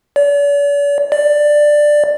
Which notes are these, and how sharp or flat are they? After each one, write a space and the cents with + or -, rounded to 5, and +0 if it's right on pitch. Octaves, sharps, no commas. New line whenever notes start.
D5 -45
D5 +10